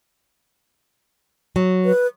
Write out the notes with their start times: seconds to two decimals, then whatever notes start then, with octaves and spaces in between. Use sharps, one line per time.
1.56 F#3
1.85 B4